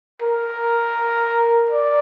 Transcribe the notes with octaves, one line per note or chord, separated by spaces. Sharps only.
A#4
D5